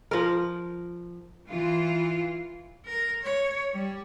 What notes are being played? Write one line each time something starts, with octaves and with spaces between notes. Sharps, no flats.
F3 A#4
E3 F4
A#4
C#5
G3